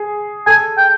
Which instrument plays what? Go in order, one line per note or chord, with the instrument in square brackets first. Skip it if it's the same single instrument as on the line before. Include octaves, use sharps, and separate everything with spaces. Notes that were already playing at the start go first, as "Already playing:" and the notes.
Already playing: [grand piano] G#4
[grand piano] A4 [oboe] G#5
[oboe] G5